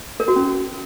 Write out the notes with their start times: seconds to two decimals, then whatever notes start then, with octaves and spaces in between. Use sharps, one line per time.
0.20 A#4
0.28 F#4
0.36 C#4